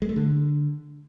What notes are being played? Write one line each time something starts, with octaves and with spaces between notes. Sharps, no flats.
G#3
A3
D3